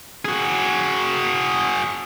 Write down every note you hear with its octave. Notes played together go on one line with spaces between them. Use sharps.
F#4 G#4